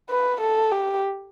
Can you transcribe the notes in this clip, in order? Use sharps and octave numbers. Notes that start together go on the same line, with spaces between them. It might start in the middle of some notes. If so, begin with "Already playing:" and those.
B4
A4
G4